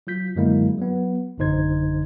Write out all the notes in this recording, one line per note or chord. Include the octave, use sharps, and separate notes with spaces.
F#3 F4 G6 B6
F#2 D3 F#3 G#3 A#3 E4
F#3 B3
A1 F#2 D3 D#4 C5 G#6